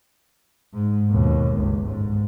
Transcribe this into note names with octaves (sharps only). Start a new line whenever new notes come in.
G#2
D#2 B2
G1 C#2
G#2